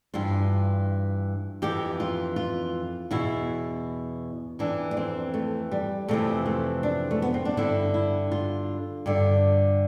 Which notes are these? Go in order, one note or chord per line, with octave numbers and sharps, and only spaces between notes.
G2 E3 F4
F2 E3 G4
F4
F4
E2 B2 E4
F2 E3 D4
D4
C4
A3
G3
F2 C3 E3 A3
A3
D4
A3
B3
C4
D4
G2 D3 E4
E4
F4
G2 D3